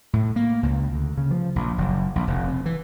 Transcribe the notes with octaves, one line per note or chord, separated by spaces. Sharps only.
A2
A#3
C#2
D2
C#3
F3
A#1
F#1
A#1
F1
C3
E3